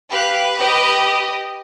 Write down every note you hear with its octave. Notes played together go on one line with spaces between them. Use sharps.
G4 B4 F5 F#6
G4 D#5